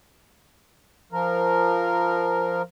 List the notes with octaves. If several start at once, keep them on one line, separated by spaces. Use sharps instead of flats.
F3 A#4